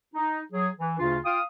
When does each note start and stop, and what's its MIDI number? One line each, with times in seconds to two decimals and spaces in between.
0.15 0.40 63
0.53 0.69 54
0.53 0.69 68
0.78 0.94 52
0.98 1.18 38
0.98 1.18 49
0.98 1.18 62
0.98 1.18 65
1.25 1.41 65
1.25 1.41 77
1.25 1.41 79
1.25 1.41 87